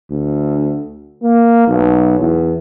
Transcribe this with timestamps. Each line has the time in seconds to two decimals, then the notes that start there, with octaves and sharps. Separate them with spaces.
0.11 D2
1.23 A#3
1.68 B1
2.20 E2